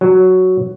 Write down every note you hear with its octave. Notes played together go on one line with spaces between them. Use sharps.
F#3